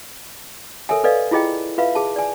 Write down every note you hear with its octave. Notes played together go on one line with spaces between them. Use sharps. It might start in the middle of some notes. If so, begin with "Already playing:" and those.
A4 A#4 C#5 E5 G#5
A4 B4 D5 D#5 F5
E4 F4 G#4 D#5 G5
F4 B4 E5 F5
G#4 A5
D5 G#5